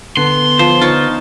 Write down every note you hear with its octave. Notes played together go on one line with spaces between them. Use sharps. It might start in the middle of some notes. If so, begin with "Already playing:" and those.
D3 B3 C6
F3 C5
D#4 F4 C#5